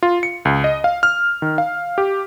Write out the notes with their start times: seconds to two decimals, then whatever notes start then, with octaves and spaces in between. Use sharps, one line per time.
0.03 F4
0.23 C#7
0.45 C#2
0.64 D#5
0.84 F5
1.03 F6
1.42 D#3
1.58 F5
1.98 G4